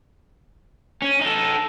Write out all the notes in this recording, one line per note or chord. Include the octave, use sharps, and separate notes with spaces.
C#4
D#4 A4